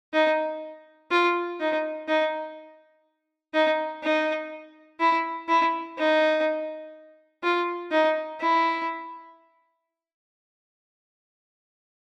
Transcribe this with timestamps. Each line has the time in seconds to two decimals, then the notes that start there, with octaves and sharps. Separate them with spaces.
0.13 D#4
1.11 F4
1.60 D#4
2.08 D#4
3.54 D#4
4.03 D#4
5.00 E4
5.49 E4
5.98 D#4
7.43 F4
7.92 D#4
8.40 E4